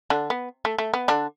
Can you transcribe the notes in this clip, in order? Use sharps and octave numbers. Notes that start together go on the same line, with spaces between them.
D3 D4
B3
A3
A3
B3
D3 D4